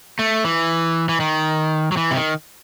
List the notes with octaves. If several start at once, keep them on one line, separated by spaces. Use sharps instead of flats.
A3
E3
E3
D#3
F#3
E3
C3
D#3